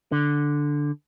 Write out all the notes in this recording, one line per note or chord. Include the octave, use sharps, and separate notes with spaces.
D3